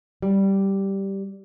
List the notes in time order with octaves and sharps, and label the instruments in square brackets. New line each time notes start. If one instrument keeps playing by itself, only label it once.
[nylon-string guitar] G3